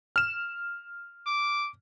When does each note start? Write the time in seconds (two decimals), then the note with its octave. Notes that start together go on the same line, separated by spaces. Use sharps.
0.16 F6 E7
1.27 D6